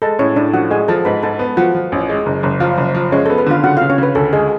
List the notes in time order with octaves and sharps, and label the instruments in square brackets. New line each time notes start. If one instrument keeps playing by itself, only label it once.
[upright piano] G#3 [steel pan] A4 A5
[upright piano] A2 [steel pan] C#4 C#5
[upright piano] A2 [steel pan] D4 D5
[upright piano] F3 [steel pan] F#4 F#5
[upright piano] G#3 [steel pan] G#4 G#5
[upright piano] F3 [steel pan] A4 A5
[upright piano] G#2 [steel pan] B4 B5
[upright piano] G#2 [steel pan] A4 A5
[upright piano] B3
[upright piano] F3 [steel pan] F#4 F#5
[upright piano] F3
A1
G#3
F#1
F#1
[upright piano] F3 [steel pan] F4 F5
[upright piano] F#1
F3
[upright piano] G#3 [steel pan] C#4 C#5
[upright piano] B3 [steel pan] A4
[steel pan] B4
[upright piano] D3 [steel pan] F4 F5
[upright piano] C#3 [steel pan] F#4 F#5
[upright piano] C#3 [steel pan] F4 F5
[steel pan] C#4 C#5
[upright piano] C#3 [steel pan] B4
[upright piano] D2 [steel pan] A4
[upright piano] G#3 [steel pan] G#4